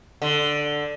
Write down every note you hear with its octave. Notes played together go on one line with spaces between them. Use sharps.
D3